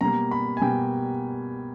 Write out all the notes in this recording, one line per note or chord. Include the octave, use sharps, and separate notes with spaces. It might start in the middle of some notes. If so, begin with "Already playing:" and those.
B2 G3 A#3 A#5
B5
G#5
B2 G3 A#3 G5